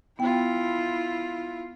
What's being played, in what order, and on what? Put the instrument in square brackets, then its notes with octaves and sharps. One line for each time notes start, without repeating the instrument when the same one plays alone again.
[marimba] B3 G5 [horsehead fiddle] E4 F4